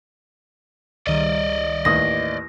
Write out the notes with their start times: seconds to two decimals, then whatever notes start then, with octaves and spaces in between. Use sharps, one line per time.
1.07 C#2 D#3 G3 D5 D#5
1.85 A1 D#2 D#6 A#6